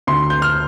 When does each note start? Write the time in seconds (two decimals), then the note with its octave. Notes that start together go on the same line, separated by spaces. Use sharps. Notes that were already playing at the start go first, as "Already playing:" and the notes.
0.07 D2 C6
0.30 G6
0.42 F6